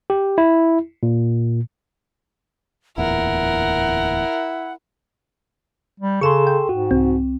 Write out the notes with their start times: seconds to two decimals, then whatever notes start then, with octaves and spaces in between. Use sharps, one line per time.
0.10 G4
0.38 E4
1.03 A#2
2.98 D1 E2 A#2 E4 A#4 F#5
6.00 G3
6.21 C#3 G#4 A4 C6 C#6 E7
6.47 G5
6.69 G#2 F#4
6.91 C2 C4